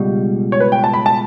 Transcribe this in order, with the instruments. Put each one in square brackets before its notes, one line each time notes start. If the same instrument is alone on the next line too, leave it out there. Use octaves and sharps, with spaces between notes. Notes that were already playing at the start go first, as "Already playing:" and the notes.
Already playing: [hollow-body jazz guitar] C#2 B2 G3
[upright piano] C#5
B4
G5
A5
B5
A5